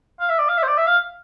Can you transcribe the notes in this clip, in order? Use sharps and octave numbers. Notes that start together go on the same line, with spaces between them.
F5
E5
D5
F5
E5
C5
D5
E5
F5